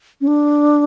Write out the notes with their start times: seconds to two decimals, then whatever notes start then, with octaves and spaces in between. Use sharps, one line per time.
0.21 C#4
0.27 D4